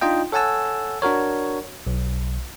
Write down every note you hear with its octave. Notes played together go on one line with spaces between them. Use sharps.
D4 D#4 F4 D#5 G5
A4 C#5 F#5 G#5 A5 E6
D4 F#4 A#4 C#5
B1